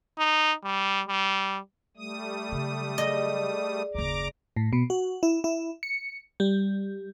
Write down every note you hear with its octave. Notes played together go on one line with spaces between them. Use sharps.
D#4
G3
G3
G3 A3 D#6
C#3 F#3
G#4 D5 D#5
F#1 D#2 A#5 D6
A2
B2
F#4
E4
E4
C#7
G3